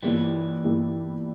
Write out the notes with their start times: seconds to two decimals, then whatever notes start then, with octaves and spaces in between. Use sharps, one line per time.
0.03 G2 E3 F3 G3 A#3 E4 G4
0.64 G2 F3 A#3 E4 G4